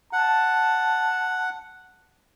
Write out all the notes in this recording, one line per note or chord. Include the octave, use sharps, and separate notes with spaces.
F#5 A5